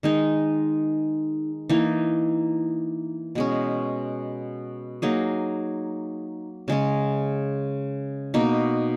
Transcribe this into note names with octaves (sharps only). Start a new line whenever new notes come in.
D#3 G#3 D#4
E3 A#3 D#4
B2 G#3 C#4
F#3 A#3 D#4 G#4
C#3 G#3 C#4
B2 A#3 D#4